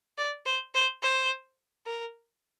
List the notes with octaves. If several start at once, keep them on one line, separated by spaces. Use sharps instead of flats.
D5
C5
C5
C5
A#4